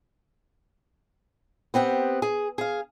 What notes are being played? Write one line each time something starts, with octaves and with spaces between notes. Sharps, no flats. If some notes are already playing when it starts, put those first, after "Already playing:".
B3 C4 G4 F#5
G#4
G#4 F5